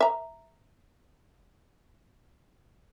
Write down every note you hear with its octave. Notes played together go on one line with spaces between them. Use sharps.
E5 A#5